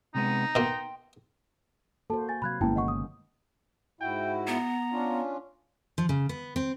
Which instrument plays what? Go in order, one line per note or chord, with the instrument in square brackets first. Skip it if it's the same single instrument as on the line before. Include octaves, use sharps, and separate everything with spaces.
[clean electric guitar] C3 G#3 B3 [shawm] D#4
[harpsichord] B2 A#3 [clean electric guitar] G5 C6
[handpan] A#3 F#4 C5 [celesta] A4 A5
[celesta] G#5 A6
[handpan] C3 F#3 F5 [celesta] B5 F#6 G#6
[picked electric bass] G1 A#3 [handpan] G#3 B3 C#4 [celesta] E4 G5 A5
[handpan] D#3 [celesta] D#5 F#5 C#6
[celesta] D#6
[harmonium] G#2 E4 F#4 [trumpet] G5
[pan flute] B3 [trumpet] A#5
[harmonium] C#4 D4 F4
[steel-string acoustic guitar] F3
C#3
B3
C4